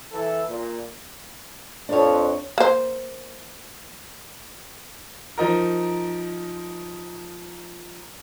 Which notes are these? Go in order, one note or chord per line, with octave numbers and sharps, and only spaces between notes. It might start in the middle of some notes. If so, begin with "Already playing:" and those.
E3 E4 A4
A#2
F2 D4 C#5
A#3 C5
F3 D#4 A#4